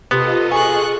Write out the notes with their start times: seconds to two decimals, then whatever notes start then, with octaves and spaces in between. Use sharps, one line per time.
0.11 C3 B3 F4 A4 D#5
0.52 G#4 C#6 F#6